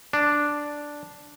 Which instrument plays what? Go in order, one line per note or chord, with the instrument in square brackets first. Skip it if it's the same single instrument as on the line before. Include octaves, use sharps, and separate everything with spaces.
[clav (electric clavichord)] D4